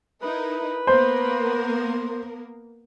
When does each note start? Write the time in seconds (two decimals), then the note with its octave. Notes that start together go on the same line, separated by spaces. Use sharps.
0.23 D#4 E4 A#4 B4
0.87 A#3 B3 A#4 C5